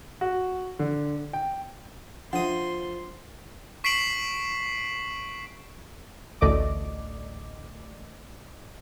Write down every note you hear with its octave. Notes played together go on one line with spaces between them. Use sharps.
F#4
D3
G5
F3 D4 A4 E5 F#5 C6 D#6
C#6 B6 C7 D7 E7 F#7
A1 D2 A3 D5 D#5 D6